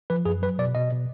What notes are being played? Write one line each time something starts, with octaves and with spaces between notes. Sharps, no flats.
F3 B4
F#2 G#4
F#3 B4
B2 D5
B2 D#5
B2